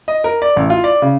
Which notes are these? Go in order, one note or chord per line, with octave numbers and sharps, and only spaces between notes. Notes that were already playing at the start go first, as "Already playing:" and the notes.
D#5
A#4
D5
A1
F4
D5
C#3